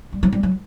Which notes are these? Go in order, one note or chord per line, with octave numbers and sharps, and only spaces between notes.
G3
F#3
G3
F#3